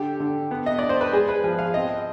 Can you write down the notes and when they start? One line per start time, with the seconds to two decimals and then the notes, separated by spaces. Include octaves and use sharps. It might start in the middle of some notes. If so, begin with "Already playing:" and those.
Already playing: D3 G4
0.20 D3
0.51 B3
0.66 D#5
0.79 D4 D5
0.89 C5
1.01 B4
1.12 G#3 G#4
1.29 B4
1.44 F3 G#4
1.59 F5
1.74 C4 D#5